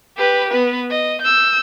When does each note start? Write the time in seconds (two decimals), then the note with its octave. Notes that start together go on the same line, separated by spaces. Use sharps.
0.17 G4 B4
0.51 B3 B4
0.90 D#5
1.22 E6 G6